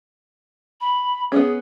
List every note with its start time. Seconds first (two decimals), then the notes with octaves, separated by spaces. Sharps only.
0.81 B5
1.32 B3 C#4 G#4